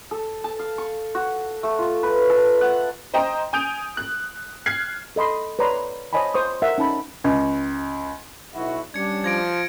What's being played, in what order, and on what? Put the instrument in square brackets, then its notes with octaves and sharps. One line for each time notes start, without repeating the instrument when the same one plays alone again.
[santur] A4
A5
F5
C#6
F#4
A3
F4
B4
A4
F#5
[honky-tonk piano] C5 D#5 G5 A#5
G#5 D#6 G6 D7 F7
F#6
F6 F#6 G#6 C7
[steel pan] A4 D#5 B5 C6
B4 C#5 D5 A#5 C6
C5 C#5 D#5 G#5 A5 B5
C5 C#6 D#6
A#4 E5 F#5
C#4 D#4 A5 B5
[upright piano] C#2
[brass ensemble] B1 E4 F#4
[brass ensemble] G3 C#4 D4 [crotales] G#6 C#7
[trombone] F3 [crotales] G#6 A#6 D7